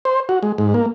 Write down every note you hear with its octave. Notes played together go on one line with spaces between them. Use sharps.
C5
F#4
G#3
G#2
A#3